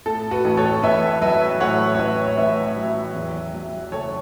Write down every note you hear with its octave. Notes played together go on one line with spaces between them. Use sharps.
A2 A4
F#4 B4
A1
A4 C#5
A1 B4 E5
F#3 B4 E5
A2 C#5 F#5
C#5
A1 B4 E5
C#5
A1 B4 E5
F#3
E2
F#3
F#1 A4 C#5